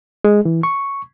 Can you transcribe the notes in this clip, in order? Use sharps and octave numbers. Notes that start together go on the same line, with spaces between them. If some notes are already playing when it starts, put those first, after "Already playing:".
G#3
E3
C#6